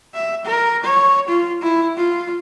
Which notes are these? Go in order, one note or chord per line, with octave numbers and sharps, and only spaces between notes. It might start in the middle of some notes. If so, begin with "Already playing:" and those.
E5
A#4
C#5
F4
E4
F4